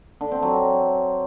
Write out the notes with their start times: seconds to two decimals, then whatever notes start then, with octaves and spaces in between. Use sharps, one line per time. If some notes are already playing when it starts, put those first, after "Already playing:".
0.21 D3
0.32 C4
0.42 F#3